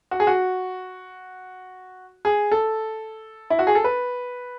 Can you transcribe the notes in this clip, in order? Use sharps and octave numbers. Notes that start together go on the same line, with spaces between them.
F#4
G#4
F#4
G#4
A4
E4
F#4
G#4
A4
B4